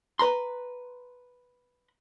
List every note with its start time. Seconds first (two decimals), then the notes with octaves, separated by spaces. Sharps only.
0.19 B4 A#5 C6